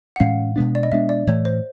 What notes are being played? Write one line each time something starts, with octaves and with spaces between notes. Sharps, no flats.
F#5
A2 E3 G#3 C#4 F5
B2 G#3 B3 D4
D5
D#5
B2 G#3 B3 D4 E5
D5
A2 E3 A3 C#5
C5